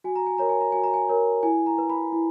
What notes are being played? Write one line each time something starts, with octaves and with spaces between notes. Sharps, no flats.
F#4 G#5
A#5
G#5
A#4 C#5 A#5
G#5
A#5
F#4 G#5
A#5
G#5
A#4 C#5
E4 G#5
A#5
B4
B5
E4